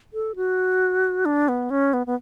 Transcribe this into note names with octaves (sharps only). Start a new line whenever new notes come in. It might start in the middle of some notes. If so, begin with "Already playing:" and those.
A4
F#4
D4
B3
C#4
B3
B3